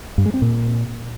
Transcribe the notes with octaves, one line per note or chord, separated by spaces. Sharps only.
G2
G#3
C4
A#2